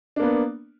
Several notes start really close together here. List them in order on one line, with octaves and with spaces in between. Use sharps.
D4 A#3 B3